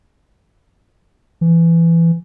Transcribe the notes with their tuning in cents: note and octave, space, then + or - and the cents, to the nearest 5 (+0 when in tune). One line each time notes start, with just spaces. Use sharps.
E3 +20